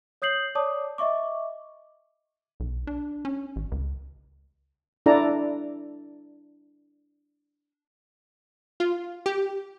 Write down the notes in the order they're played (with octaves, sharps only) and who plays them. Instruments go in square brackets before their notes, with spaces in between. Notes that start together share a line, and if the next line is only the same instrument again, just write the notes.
[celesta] C#5 D#6 G6 C7 F#7
C#5 D5 A5 D6 D#6
D#5 E5 C#6 D6
[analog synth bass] B1
D4
C#4
A1
C#2
[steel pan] D4 E4 A4 D5 A#5
[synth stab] F4
G4